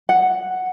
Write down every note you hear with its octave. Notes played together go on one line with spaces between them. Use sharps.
F#5